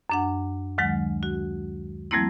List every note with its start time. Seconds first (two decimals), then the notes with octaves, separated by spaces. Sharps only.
0.10 F#2 D4 F#5
0.78 D2 D#3 F#3 G#3 F#5
1.23 F#4
2.11 F3 G3 A3 A#3 C4 E4